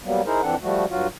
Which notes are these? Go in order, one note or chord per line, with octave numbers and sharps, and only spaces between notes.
F#3 G3 A#3 B3
D#4 E4 G#4 A#4 C5
F2 E3 C4 D4 A4 F#5
F3 G3 A3 F#4
G2 F#3 F4 F#4